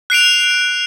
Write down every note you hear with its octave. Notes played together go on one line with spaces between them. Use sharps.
F#6 C7 D7 F7